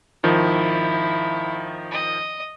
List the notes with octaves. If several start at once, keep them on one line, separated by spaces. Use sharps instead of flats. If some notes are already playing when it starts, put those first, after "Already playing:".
G#1 D#3 F3 E4
D#5